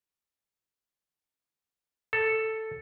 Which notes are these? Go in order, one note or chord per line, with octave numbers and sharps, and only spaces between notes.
A4